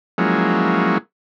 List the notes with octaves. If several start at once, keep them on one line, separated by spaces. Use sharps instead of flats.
F3 F#3 G#3 A#3 C#4 E4